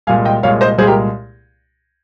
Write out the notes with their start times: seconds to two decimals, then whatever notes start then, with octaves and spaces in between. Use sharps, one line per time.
0.07 C2 A#2 G#3 F5 G#5
0.25 D#5 G5
0.43 C2 A#2 G#3 C#5 F5
0.61 C5 D#5
0.78 C2 A#2 G#3 G#4 C5
0.87 G4 A#4